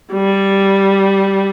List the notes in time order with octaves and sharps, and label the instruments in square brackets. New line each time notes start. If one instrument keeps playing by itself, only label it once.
[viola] G3